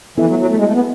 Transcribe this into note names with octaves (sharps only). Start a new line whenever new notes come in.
E3 B3 E4 A4 E5
F#3
F#3
A3
G#3
A3
B3